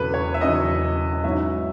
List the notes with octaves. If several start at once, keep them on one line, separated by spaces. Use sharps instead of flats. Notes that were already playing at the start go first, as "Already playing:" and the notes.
Already playing: E1 E2 C#3 F#3 A4 B4
C#5
E5
E1 E2 C#3 F#3 D#5
D#5
G#2 F#3 C#4 E4 E5